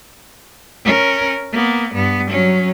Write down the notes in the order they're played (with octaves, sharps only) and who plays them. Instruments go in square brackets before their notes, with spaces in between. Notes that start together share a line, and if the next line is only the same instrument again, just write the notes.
[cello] C#4 A#4
A#3 B3
G2 B3
F#3 C#4